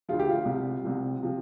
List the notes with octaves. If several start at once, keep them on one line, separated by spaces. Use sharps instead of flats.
D2 D3 F3 F4
G4
F4
C2 C3 F3
C2 C3 F3
C3 F3